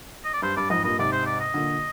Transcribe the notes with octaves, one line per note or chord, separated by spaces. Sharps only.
D#5
D5
G2 C5
G2 D5
F2 G#2 D#5
G2 A#2 D#5
G#2 C3 D5
C5
D5
D#5
A#2 D3